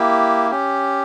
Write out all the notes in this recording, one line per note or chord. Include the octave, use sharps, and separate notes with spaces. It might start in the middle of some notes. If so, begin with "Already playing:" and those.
Already playing: A#3 E4 G4
C#4 G4